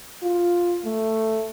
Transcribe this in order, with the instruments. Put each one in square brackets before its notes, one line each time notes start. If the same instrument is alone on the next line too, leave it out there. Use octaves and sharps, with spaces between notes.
[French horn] F4
A3